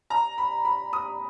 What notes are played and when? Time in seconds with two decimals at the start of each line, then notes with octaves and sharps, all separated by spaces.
0.10 A#5
0.38 B5
0.65 B5
0.93 D#6